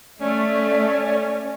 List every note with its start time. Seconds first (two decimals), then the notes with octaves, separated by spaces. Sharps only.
0.21 A3 C#4 D5